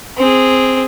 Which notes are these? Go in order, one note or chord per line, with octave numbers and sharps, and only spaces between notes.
C4 G#4